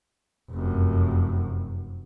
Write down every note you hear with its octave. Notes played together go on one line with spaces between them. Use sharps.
F1 F#2